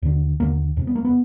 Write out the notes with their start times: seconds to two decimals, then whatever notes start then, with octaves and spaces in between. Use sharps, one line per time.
0.02 D#2 D3
0.40 D#2 D3 A#3
0.77 E2 C3
0.87 B3
0.95 A#3
1.05 B3